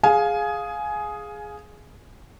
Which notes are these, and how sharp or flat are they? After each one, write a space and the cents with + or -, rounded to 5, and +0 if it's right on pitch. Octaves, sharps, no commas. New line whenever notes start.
G#4 +0 F5 +10 G#5 +15